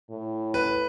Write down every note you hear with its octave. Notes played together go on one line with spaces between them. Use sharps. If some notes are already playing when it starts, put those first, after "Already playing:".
A2
B4